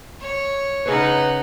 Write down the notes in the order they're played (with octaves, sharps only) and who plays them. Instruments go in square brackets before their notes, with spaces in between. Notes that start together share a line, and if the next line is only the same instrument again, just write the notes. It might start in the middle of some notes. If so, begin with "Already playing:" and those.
[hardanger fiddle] C#5
[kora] C#3 E4 C#5 [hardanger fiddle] D#4 F#5 [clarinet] B4